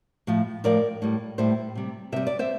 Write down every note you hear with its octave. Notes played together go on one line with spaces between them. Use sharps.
A2 F3
A2 F3 A#4 D5
A2 G3
A2 G3 C5 E5
C3 G3
C3 G3 E5
D5
C5 E5